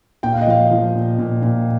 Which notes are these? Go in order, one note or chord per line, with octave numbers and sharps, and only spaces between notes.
A#2 G5
F5
D#5
F3 F5
F3
A#2
A#2
A#2